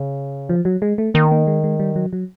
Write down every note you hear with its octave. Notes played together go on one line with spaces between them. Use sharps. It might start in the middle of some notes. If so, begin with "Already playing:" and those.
Already playing: C#3
F3
F#3
G#3
A3
D#3 A#3
A#3
G#3
G#3
G3
F#3
F#3